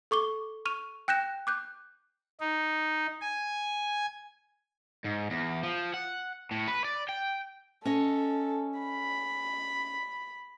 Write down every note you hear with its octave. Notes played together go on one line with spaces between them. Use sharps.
A4 C#6 D6 G7
C#6 F6 D#7 F7
G5 F#6 G6 A#6 E7
D6 F#6 G6
D#4
G#5
G#2
E2
F3
F#5
A2
B4
D5
G5
C#4 A4 D#5
B5